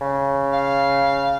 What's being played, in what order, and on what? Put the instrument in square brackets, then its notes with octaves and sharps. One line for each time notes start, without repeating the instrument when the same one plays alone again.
[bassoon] C#3
[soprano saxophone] F5